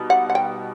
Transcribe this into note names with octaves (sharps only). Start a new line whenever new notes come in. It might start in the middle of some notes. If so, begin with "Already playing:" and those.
Already playing: B2 G3 D#4
F#5
F#5
G5